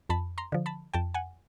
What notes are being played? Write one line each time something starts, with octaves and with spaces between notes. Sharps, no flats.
F2 A5 B5
A#5 C6
D3 F3
A5 B5
F2 G5 A5
F#5 G#5